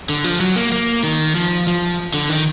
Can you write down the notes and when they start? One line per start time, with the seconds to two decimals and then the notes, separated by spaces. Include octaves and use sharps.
0.09 D3
0.24 F3
0.41 F#3
0.56 A#3
0.72 A#3
1.04 D#3
1.35 F3
1.67 F3
2.14 D3
2.29 D#3